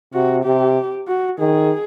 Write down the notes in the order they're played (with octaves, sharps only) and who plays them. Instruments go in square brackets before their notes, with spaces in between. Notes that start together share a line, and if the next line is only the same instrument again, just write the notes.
[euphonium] C3 [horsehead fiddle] F#4
[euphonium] C3 [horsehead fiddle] G4
[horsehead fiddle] F#4
[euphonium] D#3 [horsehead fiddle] G#4